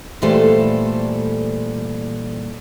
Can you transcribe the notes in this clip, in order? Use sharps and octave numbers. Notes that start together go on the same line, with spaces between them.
A#2 E3 G3 A3 A4 C5